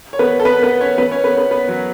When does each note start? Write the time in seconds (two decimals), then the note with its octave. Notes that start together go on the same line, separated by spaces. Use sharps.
0.13 C#5
0.19 B3 B4
0.39 A4
0.45 B3 B4
0.63 B3 B4
0.81 C#4 C#5
0.98 B3 B4
1.11 C#4 C#5
1.24 B3 B4
1.37 B3 B4
1.51 B3 B4
1.68 F#3 F#4